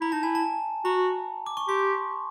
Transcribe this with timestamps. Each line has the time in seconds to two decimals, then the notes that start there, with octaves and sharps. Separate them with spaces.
0.01 E4 A#5
0.12 D#4 A5
0.23 E4 G#5
0.35 A5
0.85 F#4 A#5
1.46 D6
1.57 C#6
1.68 G4 C6